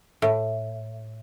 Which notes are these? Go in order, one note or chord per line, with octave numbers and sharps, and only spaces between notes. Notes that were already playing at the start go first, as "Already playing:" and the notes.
A2